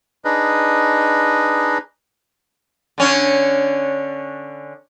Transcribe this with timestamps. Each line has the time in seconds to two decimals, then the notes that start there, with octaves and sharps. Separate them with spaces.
0.25 D4 D#4 G#4 B4 D#5
2.98 D3 C#4 D4